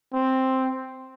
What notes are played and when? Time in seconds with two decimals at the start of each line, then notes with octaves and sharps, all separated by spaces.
0.14 C4